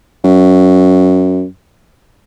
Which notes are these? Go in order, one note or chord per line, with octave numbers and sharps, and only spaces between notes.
F#2